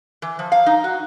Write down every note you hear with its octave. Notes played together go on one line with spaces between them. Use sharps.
E3
F3
F5
D#4
F#4